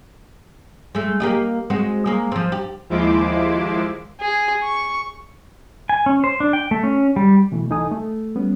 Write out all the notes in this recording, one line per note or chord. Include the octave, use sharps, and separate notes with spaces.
G#3 A3
A#3 G4 D#5
G#3 C4 F#4
G#3 A#3
F3 C4
G4
D#2 F3 G#3 E4 C6 D6
G#4
C#6
G#5
C#4
C5
D4
G5
A3
C#4
G3
B2 E3 A3
C2 E3 D#4 A4 G#5 D#6
A3
G3 B3 C#4